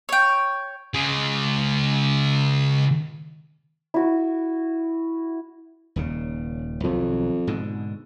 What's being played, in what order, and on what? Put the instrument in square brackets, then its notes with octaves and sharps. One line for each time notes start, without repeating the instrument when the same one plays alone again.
[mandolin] C#5 G5
[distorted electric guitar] C#3 G#3
[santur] E4 F#4
[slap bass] D#1 D#2 C#3
[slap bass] B1 D#3 F#3 [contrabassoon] F2
[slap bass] G#2 B2 D3